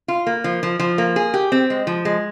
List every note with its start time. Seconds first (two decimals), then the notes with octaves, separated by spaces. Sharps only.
0.08 F4
0.27 A#3
0.44 F3
0.63 F3
0.79 F3
0.98 A#3
1.16 G#4
1.34 G4
1.52 C4
1.70 G#3
1.87 F3
2.05 G#3